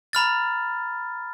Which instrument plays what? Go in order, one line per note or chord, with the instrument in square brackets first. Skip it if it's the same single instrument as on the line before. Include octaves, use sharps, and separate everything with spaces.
[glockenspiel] A#5 B5 F6 A6